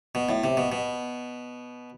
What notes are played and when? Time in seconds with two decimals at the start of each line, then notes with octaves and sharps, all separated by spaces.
0.15 B2
0.29 A2
0.44 C3
0.57 B2
0.72 B2